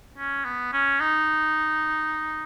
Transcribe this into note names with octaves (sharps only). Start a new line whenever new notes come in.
C#4
B3
C#4
D#4